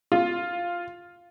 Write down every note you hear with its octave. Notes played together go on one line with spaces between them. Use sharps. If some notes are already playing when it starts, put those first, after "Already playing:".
F4